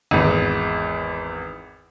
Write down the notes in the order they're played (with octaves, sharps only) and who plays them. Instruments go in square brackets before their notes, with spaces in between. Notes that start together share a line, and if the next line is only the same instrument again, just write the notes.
[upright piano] G#1 E2